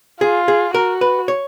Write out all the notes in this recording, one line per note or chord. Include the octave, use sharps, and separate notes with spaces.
F4 G#4
G#4
F#4 A#4
B4
C#5